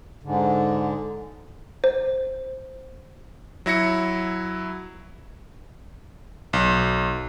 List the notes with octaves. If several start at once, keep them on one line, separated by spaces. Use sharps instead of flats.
G#2 D3
C5
F#3 E4 A#6 C#7
B1